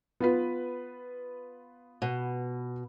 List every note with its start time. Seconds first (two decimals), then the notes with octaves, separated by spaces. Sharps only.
0.20 B3 F4 B4
2.02 B2